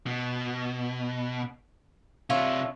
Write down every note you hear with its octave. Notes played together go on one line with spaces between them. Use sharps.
B2
C3 D4 F4 C#5 E5